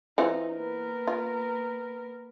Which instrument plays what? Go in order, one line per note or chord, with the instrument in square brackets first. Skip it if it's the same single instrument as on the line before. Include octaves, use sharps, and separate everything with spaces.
[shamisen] E3 C4 F4 [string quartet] D#4
[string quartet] A#3 B3 A#4
[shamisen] F4